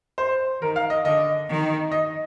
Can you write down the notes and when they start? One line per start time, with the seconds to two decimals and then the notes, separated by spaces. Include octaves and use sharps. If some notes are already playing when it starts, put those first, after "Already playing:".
0.18 C5
0.61 D#3 A#4
0.76 F5
0.90 D#5
1.05 D3 D#5
1.49 D#3
1.92 D#5